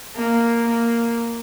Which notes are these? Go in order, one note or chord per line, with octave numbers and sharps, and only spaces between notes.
A#3
A#3